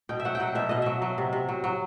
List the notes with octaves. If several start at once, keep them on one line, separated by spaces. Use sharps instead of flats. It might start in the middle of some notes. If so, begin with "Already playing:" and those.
B2 G5
E5
F#3 F#5
G5
F#3 F#5
B2 E5
B2 D#5
F#3 E5
F#3
C3
C3
F#3
F#3